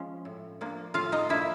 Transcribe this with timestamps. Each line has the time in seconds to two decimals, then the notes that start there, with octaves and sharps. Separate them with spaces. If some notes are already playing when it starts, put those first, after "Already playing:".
Already playing: F3 G#3 C#4
0.25 A2
0.61 F3 A#3 D4
0.94 A2 F4 F5
1.12 D#4 D#5
1.29 F3 A#3 D4 E4 E5